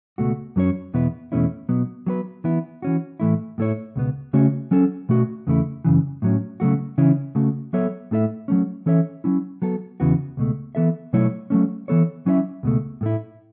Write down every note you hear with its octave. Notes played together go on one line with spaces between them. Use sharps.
C#2 B2 A3 F#4
F#2 F#3 C#4 A4 C#5
E2 B2 B3 E4 B4
E2 B2 A3 C#4 E4
B2 F#3 B3
F#3 B3 F#4 B4
E3 B3 E4
E3 C#4 F#4
A2 E3 A3 E4
A2 A3 E4 C#5
C#2 B2 B3
C#3 A3 C#4 F#4 C#5
F#3 C#4 A4
B2 A3 F#4
E2 C#3 A3 E4
F#2 C#3 E3
A2 F#3 C#4
C#3 F#3 A3 F#4
C#3 E3 C#4 E4
C#3 A3 F#4
F#3 B3 A4 C#5 E5
A2 A3 E4 A4 E5
F#3 A3 C#4
E3 C#4 A4 C#5 E5
F#3 C#4 E4
F#3 B3 A4
E2 C#3 E3 B3 F#4
C#2 B2 A3
E3 B3 A4 E5
B2 F#3 A3 E4 C#5
F#3 A3 C#4
E3 B3 A4 C#5
F#3 C#4 E4 C#5 E5
C#2 B2 A3
A2 A3 E4